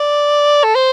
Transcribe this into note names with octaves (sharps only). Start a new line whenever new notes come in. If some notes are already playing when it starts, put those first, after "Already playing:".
Already playing: D5
A4
C5